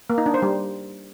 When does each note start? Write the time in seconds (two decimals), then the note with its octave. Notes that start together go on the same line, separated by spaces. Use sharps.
0.10 A#3
0.18 D#4
0.26 D4
0.34 C5
0.42 G3